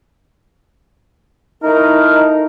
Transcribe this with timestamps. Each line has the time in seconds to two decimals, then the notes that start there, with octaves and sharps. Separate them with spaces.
1.63 A3 D#4 E4 A#4